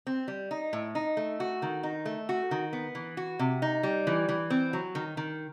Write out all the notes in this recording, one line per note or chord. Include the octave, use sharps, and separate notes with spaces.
C4
G3
D#4
A2
D#4
A3
F#4
D#3
D#4
A3
F#4
D#3
B3
E3
F#4
C3
D#4
G3
E3
E3
C4
F#3
D#3
D#3